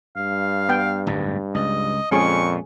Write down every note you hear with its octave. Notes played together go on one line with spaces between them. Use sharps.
G2 F5
B3 G5
D1 G1 G#2
C#2 D#5
F2 A#2 G#3 C#4 G#4 C#6